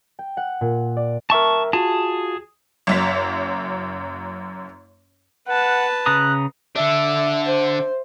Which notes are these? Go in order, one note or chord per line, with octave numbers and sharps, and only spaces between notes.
G5
F#5
A#2
D5
A#4 E5 G5 A5 C#6
F4 F#4 G#4 A5
F#1 F#2 B6
B4 F#5 A5
C#3 A#5 D#6 F#6
D3 D4 E5
C5